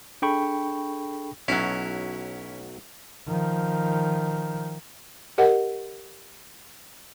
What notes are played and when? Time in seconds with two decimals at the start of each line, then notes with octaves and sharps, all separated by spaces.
0.22 D4 G#4 A4 G5 B5 C#6
1.48 B1 F#3 C#4 E4
3.28 D#3 F3
5.38 G4 A#4 D#5 F#5